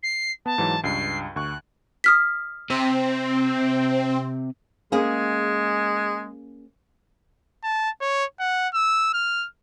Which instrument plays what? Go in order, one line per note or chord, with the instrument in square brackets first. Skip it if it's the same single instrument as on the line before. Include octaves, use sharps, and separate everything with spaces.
[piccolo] C7
[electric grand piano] B3 [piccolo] A5
[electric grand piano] G#2 E3 F#3
[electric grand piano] C#2 G2 [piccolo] C7
[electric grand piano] D2 C#6 [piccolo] F#6
[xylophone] D#6 F6 B6
[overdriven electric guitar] C3 [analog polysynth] C4
[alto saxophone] G#3 [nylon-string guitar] A#3 C#4 G#4
[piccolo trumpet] A5
C#5
F#5
E6
F6